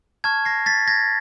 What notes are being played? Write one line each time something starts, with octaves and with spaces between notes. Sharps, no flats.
A5 C#6 F6 G#6
A#6 C7
A6 B6
G#6 A#6